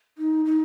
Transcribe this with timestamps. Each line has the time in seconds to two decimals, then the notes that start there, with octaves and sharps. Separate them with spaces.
0.18 D#4
0.45 D#4